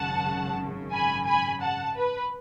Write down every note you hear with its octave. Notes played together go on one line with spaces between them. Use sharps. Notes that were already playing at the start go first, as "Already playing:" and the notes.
Already playing: G#1 F#2 C#3 F#5 A5
G#5 B5
G#5 B5
F#5 A5
B4